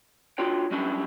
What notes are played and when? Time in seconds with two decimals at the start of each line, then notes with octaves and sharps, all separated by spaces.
0.38 D4 F4 F#4 C#5 G5
0.71 F#3 G3 C#4 D4 E4